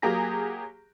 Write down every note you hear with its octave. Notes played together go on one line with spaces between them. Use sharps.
F#3 A#3 G4 G#4 A#5 A#6